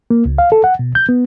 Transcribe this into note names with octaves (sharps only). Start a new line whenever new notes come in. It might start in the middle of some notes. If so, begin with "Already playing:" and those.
A#3
C#2
F5
A4
F#5
B2
G6
B3